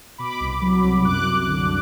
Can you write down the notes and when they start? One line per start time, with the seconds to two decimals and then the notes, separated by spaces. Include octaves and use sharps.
0.18 B2 B5 D6
0.40 C2
0.62 F#3
0.84 C2
1.05 F#2 D6 F#6
1.27 F#2
1.49 D3